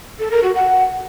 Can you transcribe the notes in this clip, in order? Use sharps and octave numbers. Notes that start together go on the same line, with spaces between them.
A4
A#4
F#4
F#5